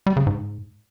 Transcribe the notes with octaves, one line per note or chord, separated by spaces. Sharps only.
G3
C#3
G#2